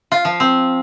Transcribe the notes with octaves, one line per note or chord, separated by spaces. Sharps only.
F4
F3
C4